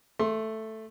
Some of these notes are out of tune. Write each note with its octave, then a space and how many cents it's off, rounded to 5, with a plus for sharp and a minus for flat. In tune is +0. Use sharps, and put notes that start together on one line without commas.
A3 +0 C6 +25